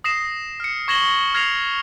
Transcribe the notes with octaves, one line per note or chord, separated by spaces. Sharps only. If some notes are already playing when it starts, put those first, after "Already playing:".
D#6 A#6 C7 E7
F6 C#7
C#6 G#6 A#6 E7 F#7 G7
F6 G#6 A#6 C7 C#7 F7